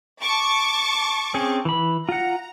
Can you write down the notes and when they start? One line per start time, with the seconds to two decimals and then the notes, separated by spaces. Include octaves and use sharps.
0.22 A5 C#6 D6
1.34 C4 C#4 G#4
1.65 E3 B5
2.09 F4 F#5 A#5